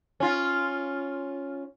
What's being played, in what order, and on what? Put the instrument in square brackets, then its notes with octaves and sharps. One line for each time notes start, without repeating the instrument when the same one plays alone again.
[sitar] C#4 F4